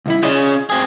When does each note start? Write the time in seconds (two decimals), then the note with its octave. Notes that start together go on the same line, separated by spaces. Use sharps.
0.06 C2 D#3 E4
0.23 C#3 F4 D5 D#5
0.70 C4 G#4